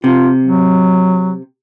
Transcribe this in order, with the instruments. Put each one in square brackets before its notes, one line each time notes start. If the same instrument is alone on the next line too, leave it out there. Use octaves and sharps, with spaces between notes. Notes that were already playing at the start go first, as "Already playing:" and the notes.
[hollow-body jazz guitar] C3 [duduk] F4
[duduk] F#3